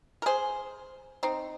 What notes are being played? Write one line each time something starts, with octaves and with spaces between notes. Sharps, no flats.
A#4
G#4 C5
C4 D#4